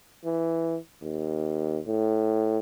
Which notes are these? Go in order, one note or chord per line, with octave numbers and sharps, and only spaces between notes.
E3
D#2
A2